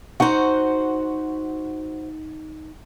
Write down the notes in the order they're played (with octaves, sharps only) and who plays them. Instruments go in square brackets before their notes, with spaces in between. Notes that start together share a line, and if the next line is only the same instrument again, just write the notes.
[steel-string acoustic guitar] D#4 F#5 [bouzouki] F#4 C5